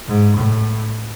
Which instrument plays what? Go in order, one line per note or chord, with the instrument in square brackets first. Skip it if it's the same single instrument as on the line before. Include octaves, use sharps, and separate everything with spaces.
[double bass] G#2
A2